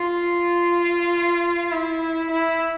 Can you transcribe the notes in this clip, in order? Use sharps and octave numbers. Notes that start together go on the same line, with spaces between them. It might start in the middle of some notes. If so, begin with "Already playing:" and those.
Already playing: F4
E4
E4